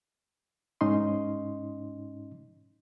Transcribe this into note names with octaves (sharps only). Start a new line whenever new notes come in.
G#2 C#4 D#4 D#5 C6